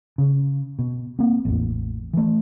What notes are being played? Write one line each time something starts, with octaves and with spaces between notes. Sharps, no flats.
C#3
B2
A#3 C4
A1 E2
E3 A3